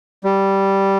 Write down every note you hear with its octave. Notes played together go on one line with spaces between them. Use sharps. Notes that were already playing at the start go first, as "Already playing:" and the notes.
G3